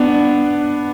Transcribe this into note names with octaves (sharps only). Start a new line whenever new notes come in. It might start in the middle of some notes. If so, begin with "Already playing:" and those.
Already playing: B3 D4